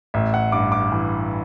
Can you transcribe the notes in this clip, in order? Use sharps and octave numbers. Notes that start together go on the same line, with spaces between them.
A1 E5
F#5
G2 D6
D6
E3